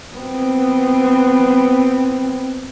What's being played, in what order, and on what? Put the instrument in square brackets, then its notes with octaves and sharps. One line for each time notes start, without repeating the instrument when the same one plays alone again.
[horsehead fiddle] B3 C4